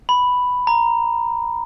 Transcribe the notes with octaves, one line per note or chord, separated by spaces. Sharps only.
B5
A#5